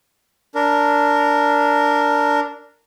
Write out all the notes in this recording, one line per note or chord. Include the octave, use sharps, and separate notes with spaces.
D4 A#4